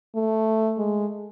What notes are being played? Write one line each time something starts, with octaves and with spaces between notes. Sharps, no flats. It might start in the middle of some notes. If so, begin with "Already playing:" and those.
A3
G#3